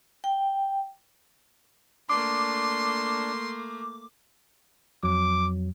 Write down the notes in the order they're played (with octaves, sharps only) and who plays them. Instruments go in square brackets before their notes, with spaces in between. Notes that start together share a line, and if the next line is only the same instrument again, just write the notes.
[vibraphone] G5
[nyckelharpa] A3 A#3 [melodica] D4 [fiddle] C6 [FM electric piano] D6
[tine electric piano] F2 F#3 [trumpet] D6